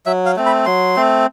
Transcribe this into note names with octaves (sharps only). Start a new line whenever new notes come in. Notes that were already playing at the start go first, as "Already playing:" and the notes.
F#3 E5
F5
A3 C4
B5
F#3 C6
A3 C4